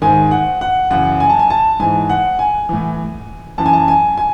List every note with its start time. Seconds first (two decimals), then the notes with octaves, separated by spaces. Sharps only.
0.02 G#2 D#3 G#5
0.31 F#5
0.61 F#5
0.91 F#2 C#3 E3 F#5
1.20 G#5
1.30 A5
1.39 G#5
1.50 A5
1.80 G#2 E3 G#5
2.10 F#5
2.39 G#5
2.69 A2 E3
3.58 F#2 E3 A5
3.66 G#5
3.73 A5
3.88 G#5
4.18 G#5